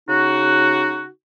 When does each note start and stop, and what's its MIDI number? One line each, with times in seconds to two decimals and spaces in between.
0.09 1.08 49
0.09 1.08 63
0.09 1.08 66